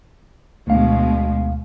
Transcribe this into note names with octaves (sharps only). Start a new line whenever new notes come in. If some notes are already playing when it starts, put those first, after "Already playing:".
D2 B2 G#3 F5